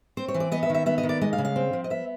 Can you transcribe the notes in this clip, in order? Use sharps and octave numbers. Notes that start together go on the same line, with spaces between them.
C4 C5
C#5
E3
D5
B3 D#5
E5
D#3
E5
B3 E5
D#5
D#3
D5
G#3 D#5
F5
C#3
F5
C4
F3
D#5
B3 E5